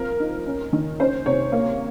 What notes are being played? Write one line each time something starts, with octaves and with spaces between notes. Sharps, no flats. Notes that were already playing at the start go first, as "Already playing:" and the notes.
Already playing: F3 C4 A#4
D#4
C#4
D#3
C#4 C5
C3 C#5
A#3